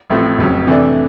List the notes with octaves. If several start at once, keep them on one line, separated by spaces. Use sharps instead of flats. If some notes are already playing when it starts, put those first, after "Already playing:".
A1 A2 F3 A3 C4
F1 F2 C#3 F#3
C3 E3 A3 D4